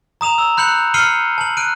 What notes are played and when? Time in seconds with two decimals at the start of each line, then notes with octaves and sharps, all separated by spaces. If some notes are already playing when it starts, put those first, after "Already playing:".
0.21 A#5 D#6 E7 F7
0.38 E6
0.57 B5 F#6 G6 C#7 F#7
0.94 F6 C7 C#7 D#7 F#7 G7
1.38 A5 F#7
1.57 F#6 D7 D#7